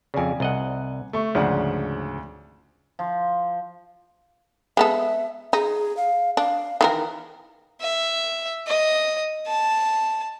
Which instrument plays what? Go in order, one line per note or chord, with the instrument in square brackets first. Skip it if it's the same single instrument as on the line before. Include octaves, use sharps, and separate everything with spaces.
[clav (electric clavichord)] F2 C#3 [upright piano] D5 G#5
[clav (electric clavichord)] C2 D#5 F#5
[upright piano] A3 C#6
[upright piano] D2 D4 F#5 [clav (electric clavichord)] G#2 C#3 F3
[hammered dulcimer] F3
[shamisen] G#3 B3 A4 [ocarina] E5
[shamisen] D#4 [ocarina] G#4
[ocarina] F5
[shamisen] D4 [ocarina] F5
[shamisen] D#3 E3 A#4 [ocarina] F5
[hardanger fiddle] E5
D#5
A5